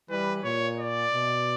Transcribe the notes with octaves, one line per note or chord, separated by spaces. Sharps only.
E3 G3 B4
A#2 C#5
D5
B2